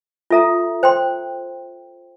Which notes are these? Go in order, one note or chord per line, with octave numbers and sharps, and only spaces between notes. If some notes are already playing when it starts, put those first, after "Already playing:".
F4 A4 E5 A#5
C5 G5 C6